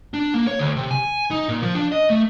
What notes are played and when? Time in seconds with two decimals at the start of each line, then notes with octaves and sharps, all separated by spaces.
0.14 D4
0.34 A#3
0.47 C#5
0.59 D2
0.77 C3
0.91 G#5
1.31 D#4
1.49 A#2
1.62 F3
1.75 D4
1.92 D#5
2.10 A3